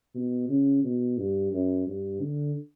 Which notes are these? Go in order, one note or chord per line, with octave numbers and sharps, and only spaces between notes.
B2
C#3
B2
G2
F#2
G2
D3